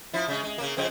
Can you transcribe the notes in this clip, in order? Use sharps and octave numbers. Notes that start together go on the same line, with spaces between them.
F3 E4
C#3 G#3
G#3
C#3 A#3
F2 C#3 C4